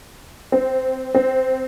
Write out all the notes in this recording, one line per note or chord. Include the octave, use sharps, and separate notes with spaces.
C4
C4